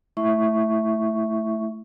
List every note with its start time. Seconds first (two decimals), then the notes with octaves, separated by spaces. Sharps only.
0.17 A3 E4 E5 C#6